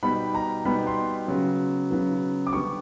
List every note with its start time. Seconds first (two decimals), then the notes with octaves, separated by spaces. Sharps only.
0.03 B2 G3 B3 D#4 B5
0.35 A#5
0.65 B2 G3 B3 D#4 B5
0.87 C6
1.28 C#3 F#3 B3
1.91 C#3 F#3 B3
2.47 D6
2.53 D3 G3 B3 C#6